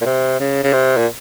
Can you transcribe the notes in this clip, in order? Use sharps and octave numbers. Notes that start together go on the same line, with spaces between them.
A#2
C3
C#3
C#3
C3
A#2